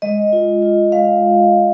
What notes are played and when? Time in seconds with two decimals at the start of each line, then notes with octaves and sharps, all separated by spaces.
0.02 G#3 D#5
0.33 F4
0.62 F4
0.92 G#3 F5